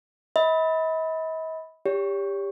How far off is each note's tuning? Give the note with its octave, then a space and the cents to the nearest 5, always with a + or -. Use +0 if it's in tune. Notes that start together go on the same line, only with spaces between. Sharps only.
D#5 +45 B5 +0
G4 +20 C#5 +35